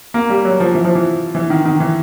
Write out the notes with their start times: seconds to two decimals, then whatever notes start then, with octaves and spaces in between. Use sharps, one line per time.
0.14 A#3
0.30 G3
0.45 F#3
0.60 F3
0.75 E3
0.85 F3
0.95 E3
1.35 E3
1.50 D#3
1.65 D#3
1.80 E3